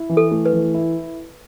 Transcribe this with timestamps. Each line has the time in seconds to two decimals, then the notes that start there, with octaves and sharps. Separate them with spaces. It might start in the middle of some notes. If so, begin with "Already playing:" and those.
Already playing: E4
0.09 E3
0.17 A4
0.31 A3
0.45 B4
0.53 E3
0.74 E4